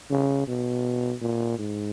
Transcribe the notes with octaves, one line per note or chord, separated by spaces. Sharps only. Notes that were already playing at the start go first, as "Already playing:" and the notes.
C#3
B2
A#2
G#2